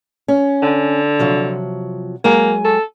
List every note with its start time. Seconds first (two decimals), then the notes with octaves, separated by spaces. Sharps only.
0.28 C#4
0.62 D3
1.19 C3 F3 F#3
2.24 F#3 G#3 A#3 G#5
2.65 A4